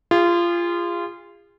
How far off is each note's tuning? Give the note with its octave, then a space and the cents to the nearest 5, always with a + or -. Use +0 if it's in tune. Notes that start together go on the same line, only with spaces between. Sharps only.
F4 -20 G#4 -40